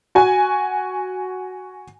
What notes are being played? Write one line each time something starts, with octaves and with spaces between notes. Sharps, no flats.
F#4 G#5